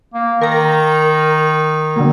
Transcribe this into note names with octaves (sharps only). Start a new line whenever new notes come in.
A#3
D#3 A#4 A#5
D3 F#3 A#3